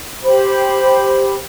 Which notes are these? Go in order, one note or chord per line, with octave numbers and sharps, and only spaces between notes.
G4 C5 B5